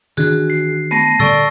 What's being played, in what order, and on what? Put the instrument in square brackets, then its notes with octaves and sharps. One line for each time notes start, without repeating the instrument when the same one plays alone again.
[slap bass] D#3 E3 D4 [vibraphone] F#4 G#4
[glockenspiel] C7
[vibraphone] A3 B3 [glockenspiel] A5 A#6 C7
[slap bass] A#2 D3 G3 [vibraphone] A4 D5 [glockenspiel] C#6 E6 A6